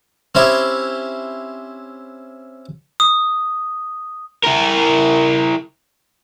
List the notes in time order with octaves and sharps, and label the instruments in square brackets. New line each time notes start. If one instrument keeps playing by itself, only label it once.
[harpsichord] C4 C#4 E4 G4
[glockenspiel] D#6
[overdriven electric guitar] E4 A#4